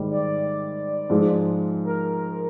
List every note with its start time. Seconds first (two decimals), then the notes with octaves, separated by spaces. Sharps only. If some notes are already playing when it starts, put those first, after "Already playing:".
Already playing: G#2 D#3 G3
0.10 D5
1.10 G#2 F3 G#3
1.84 A#4